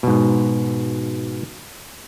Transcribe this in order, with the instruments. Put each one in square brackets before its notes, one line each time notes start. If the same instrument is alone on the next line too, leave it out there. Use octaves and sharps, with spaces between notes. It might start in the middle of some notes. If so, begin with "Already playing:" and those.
[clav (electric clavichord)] G#2 B2